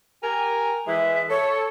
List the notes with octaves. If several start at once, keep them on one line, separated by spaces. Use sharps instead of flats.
G4 A#4 G#5
E3 G#3 E5
A4 C#5